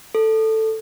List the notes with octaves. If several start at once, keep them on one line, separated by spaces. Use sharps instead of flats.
A4